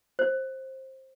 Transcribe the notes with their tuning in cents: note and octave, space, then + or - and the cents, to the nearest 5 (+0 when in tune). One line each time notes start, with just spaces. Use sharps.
C5 +15